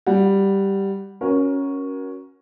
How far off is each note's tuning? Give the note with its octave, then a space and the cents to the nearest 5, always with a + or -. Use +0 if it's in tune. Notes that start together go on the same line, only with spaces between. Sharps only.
G3 +0 F#5 +10
C#4 +0 F#4 +0 A#4 +20